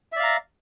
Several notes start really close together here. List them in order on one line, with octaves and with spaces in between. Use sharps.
E5 D5 F5 A#5